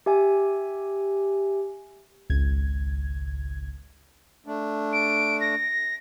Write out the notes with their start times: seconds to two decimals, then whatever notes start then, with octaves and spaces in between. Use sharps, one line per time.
0.06 G4 E5 G#5
2.29 G#1 C#2 G#6
4.46 A3 D4
4.93 D7
5.41 A#6